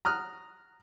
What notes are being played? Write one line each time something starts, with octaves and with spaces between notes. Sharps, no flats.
A#5 D#6 F6 F#6